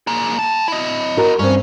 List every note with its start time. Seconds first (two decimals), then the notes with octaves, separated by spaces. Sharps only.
0.07 A#3 G#4
0.39 G5 A5
0.68 E4 D#5
1.17 F#4 A#4
1.39 G2 C4 C#4